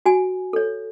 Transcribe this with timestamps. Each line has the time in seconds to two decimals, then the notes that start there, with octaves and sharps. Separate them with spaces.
0.06 F#4 G#5
0.53 A4 C#5